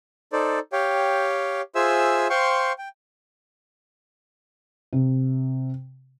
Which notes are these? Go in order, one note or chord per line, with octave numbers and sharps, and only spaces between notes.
D#4 A4 C5 D5
G4 C#5 F5 G5
F4 G#4 C5 E5 G#5 E6
C5 F5 G5 C6 C#6
G5
C3